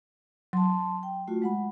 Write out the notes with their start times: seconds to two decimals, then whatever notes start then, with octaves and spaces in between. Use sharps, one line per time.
0.53 F#3 A5 C6
1.03 G5
1.28 A3 F4 F#4
1.42 G#3 F#5 B5